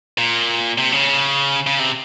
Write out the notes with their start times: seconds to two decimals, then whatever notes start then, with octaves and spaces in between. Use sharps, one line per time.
0.18 A#2
0.78 C3
0.92 C#3
1.67 C#3
1.79 C3